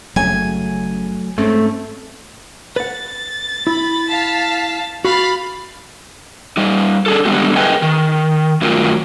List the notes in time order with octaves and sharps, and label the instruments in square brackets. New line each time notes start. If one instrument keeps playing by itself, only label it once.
[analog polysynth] G1 C#3 [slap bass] F#3 A3 [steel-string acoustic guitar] G#5
[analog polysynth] G#2 C4 C#4 [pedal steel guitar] A3
[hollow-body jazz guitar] B4 F#5 [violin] A6
[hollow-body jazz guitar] E4 [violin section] B5
[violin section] F5 A5 B6
[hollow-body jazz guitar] F#4 [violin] F5 [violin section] B5 A6
[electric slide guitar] G3 D#4
D4 G#4 A4
D3 G3 G#3 B3 G4
G#4 A#4 B4 D#5 G5 G#5
D#3
G2 D#3 F#3 A3 F4 A#4